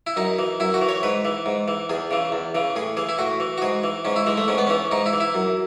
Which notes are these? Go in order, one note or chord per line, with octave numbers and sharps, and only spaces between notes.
E4
F#2 D#4
E3
F#2 E4
F#4
E3
C#5
G#2 B4
E3
G#2
E3
E2 G#4
C#3 E3
E2
C#3 E3
A2 G#4
E3 G#4
E4
A2 F#4
E3
F#4
G#2 G#4
E3
G#2 C#4
E4
E3 G#3
A3
G#2 C#4
B3
E3 C#4
G#2 D#4
E4
E3
E4
F#2